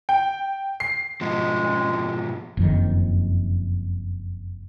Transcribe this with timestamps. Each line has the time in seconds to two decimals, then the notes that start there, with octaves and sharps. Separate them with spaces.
0.09 G5
0.80 C7
1.21 G#2 B2 F3 G#3
2.57 F#1 F2 D#3